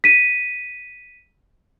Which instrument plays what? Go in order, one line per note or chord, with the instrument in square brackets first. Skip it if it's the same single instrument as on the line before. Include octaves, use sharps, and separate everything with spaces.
[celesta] B6 D#7